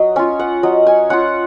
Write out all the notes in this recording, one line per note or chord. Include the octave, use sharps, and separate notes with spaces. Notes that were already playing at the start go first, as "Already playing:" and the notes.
Already playing: F#3 D#5
C#4 F4 G#5
F#5
F#3 D#5
G#5
C#4 F4 F#5